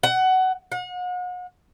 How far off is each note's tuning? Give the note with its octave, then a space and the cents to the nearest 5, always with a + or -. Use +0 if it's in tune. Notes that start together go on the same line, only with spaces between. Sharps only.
F#5 +20
F#5 -40